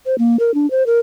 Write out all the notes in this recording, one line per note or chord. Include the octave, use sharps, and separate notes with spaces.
C5
A#3
A#4
D4
C5
A#4